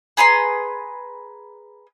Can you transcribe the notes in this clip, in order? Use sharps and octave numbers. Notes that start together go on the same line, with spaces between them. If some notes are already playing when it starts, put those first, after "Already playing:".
G#4 B4 A#5 C6